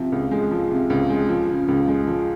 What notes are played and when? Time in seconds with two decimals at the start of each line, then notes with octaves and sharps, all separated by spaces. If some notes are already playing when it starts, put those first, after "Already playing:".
Already playing: C3 F3
0.12 C#2
0.31 G#3
0.52 F3
0.71 C3
0.90 C#2
1.09 G#3
1.29 F3
1.48 C#3
1.68 C#2
1.88 G#3
2.07 F3